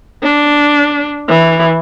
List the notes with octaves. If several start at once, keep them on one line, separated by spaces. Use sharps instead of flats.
D4
E3